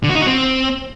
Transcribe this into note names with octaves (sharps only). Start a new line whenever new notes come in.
D3
F#4
D#4
F#4
C4